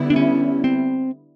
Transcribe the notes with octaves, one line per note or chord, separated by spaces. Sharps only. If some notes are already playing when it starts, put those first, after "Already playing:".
Already playing: D3 G3 B3 E4
D4
C#4
C4